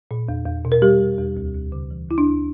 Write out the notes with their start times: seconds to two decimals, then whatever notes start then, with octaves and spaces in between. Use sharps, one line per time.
0.11 A#2
0.29 E2
0.46 E2
0.65 B2
0.72 A#4
0.82 G3 G4
1.01 E2
1.18 E2
1.37 D2
1.54 D2
1.72 C#3
1.91 E3
2.09 D2 E4
2.18 D4
2.27 D2